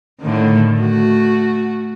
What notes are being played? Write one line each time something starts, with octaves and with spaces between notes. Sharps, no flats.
A2 D3 D#3
A3 F#4